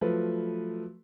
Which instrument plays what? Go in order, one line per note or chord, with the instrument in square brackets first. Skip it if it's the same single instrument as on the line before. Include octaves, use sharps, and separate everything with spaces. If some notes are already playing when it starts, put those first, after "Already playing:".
[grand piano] F3 F#3 A3 B4